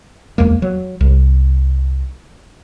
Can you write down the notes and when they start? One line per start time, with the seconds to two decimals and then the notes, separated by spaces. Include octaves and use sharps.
0.38 D1 E2 G#3 A#3
0.62 F#3
1.01 C2